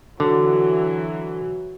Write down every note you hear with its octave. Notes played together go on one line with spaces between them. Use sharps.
D3 E3 F#3